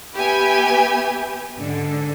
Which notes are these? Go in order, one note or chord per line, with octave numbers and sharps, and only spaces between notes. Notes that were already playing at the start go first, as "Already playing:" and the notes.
B3 G4 B4 E5 G#5
G#2 D3